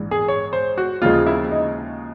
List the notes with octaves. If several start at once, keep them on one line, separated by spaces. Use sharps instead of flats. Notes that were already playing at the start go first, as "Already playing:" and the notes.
Already playing: A#1 G#2 E3 G#3
G#4
C#5
C5
F#4
D#2 C#3 F3 G#3 F4
E4
D#4